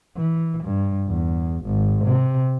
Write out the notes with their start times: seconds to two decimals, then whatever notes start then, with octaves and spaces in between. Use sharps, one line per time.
0.17 E3
0.64 G2
1.08 E2
1.65 G#1
2.05 C3